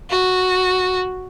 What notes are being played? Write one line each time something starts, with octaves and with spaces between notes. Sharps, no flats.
F#4